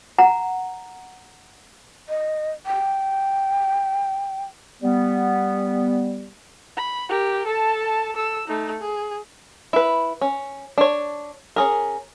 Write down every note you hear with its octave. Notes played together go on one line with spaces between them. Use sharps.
F#5 A#5
D#5
G5
G3 B3
B5
G4 A#4
A4 A5
A4 E6
A3 D#4
G#4
E4 B4
C#4
D4 C#5
C#4 G#4 A#4